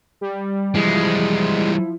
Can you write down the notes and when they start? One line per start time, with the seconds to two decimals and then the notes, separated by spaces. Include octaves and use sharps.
0.21 G3
0.75 E3 F3 G3 G#3 E4